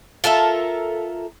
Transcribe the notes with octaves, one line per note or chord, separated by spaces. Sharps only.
F4 A4 A#4 E5